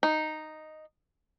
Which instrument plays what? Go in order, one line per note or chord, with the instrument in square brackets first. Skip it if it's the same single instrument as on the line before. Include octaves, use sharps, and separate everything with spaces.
[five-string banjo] D#4